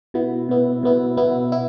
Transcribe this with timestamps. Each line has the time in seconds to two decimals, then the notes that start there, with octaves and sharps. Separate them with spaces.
0.14 B2 B3 E4
0.49 B2 B3 E4
0.83 B2 B3 E4
1.17 B2 B3 E4
1.52 E4